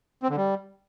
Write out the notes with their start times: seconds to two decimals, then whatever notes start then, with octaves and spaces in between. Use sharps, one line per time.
0.23 C4
0.30 D3
0.37 G3